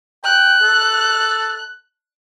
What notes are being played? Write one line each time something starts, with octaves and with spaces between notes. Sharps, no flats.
G5 F#6
A4